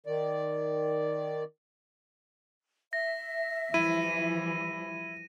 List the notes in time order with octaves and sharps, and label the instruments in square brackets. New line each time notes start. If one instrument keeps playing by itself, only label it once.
[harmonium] D#3 D5
[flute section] E5 [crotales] A#6
[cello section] E3 F3 G3 [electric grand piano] E4 [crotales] D#7